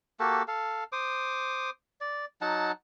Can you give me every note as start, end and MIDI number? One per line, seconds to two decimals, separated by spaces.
0.20 0.42 58
0.20 0.42 66
0.20 0.42 67
0.20 0.42 69
0.48 0.84 69
0.48 0.84 77
0.92 1.70 72
0.92 1.70 86
0.92 1.70 87
2.01 2.25 74
2.41 2.72 54
2.41 2.72 63
2.41 2.72 78
2.41 2.72 81